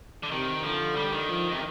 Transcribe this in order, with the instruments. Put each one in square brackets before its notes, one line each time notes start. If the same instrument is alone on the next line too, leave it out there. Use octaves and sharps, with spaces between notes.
[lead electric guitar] D3
[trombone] C3 [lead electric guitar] D#3
[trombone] D3 [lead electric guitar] F3
[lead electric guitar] G3
D#3
[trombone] F3
[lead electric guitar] C3